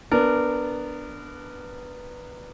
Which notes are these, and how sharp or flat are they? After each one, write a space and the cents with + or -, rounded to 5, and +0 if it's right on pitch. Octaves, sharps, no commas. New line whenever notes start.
B3 +0 D4 +0 A#4 -20